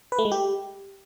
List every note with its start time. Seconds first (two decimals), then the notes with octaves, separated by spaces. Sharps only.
0.12 B4
0.19 A3
0.25 G#3
0.32 G4